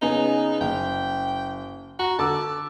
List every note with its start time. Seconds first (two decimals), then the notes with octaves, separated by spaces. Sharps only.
0.02 C#3 B3 D#4 G#4
0.61 F#1 G5
1.99 F#4 A#5
2.19 D3 A5 D6 E6